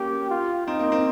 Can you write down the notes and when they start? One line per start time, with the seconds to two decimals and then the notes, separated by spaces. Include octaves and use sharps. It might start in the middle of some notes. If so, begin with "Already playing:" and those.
Already playing: A#3 C#4 G4
0.30 F4
0.67 C4 D#4
0.80 A#3
0.92 C4